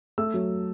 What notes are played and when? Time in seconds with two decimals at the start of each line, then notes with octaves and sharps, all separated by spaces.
0.18 A3 E6
0.34 F#3